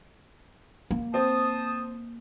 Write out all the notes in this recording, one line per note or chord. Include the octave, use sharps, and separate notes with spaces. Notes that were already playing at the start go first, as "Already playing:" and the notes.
A#3
C4 A5 D#6